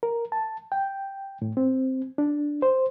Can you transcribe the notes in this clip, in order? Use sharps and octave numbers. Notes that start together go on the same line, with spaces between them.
A#4
A5
G5
A2
C4
D4
C5